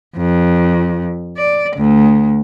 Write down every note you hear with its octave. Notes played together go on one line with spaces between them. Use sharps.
F2
D5
D2